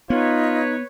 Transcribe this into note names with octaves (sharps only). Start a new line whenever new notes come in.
B3 D#4 F4 B4 C#5